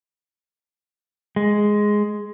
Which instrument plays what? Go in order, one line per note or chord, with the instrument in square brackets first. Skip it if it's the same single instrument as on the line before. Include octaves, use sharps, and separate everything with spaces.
[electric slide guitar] G#3